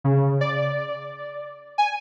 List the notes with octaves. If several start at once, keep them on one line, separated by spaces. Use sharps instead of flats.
C#3
D5
G#5